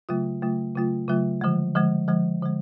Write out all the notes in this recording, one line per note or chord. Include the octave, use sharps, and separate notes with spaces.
C#3 F#3 A3 F4
C#3 F#3 A3 F4
C#3 F#3 A3 F4
C#3 F#3 A3 F4
D3 F3 G#3
D3 F3 G#3
D3 F3 G#3
D3 F3 G#3